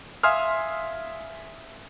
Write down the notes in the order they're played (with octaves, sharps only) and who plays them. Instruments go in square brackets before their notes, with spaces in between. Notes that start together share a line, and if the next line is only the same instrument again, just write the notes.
[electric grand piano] E5 F5 G#5 C6 D#6 F6